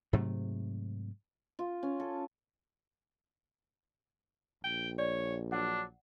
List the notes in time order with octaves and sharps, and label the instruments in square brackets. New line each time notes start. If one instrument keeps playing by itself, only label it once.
[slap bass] G#2 C3 F#3 A3
[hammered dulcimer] F4
C#4
A4
[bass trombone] A#1 [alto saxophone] G5
[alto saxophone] C#5 [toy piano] D5
[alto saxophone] F#3 [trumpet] D4 [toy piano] F#5